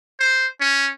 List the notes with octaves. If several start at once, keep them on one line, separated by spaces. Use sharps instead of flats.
C5
C#4